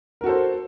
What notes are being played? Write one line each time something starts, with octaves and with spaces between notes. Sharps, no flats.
F#4 A4 A#4 C5